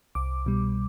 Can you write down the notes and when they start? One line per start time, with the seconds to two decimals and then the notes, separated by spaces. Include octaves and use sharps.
0.15 C2 D6
0.46 B2 G3